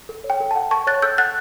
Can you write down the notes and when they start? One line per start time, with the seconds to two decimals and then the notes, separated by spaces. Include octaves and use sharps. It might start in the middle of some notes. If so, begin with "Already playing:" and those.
0.09 A4
0.24 C#5
0.30 G5
0.40 A4
0.51 A5
0.56 F#5
0.71 A4 A5 C#6
0.87 C#5 F#6 A6
1.02 A4 E6 G6
1.18 F#5 F#6 A6